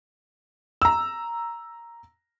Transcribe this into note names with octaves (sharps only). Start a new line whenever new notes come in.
A#5 E6